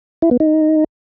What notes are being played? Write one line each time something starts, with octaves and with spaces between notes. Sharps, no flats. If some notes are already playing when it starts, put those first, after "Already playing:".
E4
B3
D#4